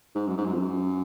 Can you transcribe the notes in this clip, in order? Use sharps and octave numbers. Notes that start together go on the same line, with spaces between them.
G#2
F#2
G#2
F#2
F2
F#2